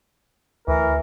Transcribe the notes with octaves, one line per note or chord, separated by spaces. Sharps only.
D2 E3 A#4